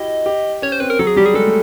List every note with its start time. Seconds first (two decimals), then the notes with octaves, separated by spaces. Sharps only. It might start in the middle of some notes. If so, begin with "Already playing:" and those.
Already playing: E4 F#4 G4 D#5
0.26 G4
0.62 C#4 C#5
0.72 C5
0.80 C4 B4
0.90 A#4
0.99 F#3 A4
1.07 G#4
1.16 G3 G4
1.26 G#4
1.34 G#3 A4
1.47 A3